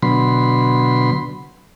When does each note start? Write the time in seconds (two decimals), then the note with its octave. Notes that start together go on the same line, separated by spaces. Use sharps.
0.02 B2 D3 F#3 B5 C6